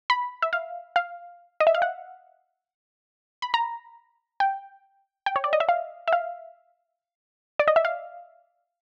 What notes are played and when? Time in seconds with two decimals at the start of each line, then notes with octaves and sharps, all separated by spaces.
0.10 B5
0.42 E5
0.53 F5
0.96 F5
1.60 D#5
1.67 E5
1.75 F5
1.82 F#5
3.42 B5
3.54 A#5
4.40 G5
5.26 G5
5.36 C#5
5.44 D5
5.53 D#5
5.60 E5
5.69 F5
6.08 E5
6.13 F5
7.59 D5
7.68 D#5
7.76 E5
7.85 F5